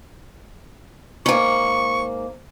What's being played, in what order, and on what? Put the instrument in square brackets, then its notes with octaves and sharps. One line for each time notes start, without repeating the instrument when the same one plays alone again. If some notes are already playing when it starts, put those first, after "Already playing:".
[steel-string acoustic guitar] G#2 A#3 [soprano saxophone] C#6